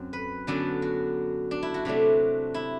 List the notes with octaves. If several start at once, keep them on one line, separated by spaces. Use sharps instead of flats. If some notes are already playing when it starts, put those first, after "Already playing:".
Already playing: F#2 F#3 C4
B4
F#2 D3 F#3 B3 D4 A4
F#4
D4
E4
F#4
C3 F#3 A3 D4 F#4
E4